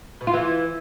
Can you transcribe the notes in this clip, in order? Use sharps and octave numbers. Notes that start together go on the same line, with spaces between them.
B2
F4
E3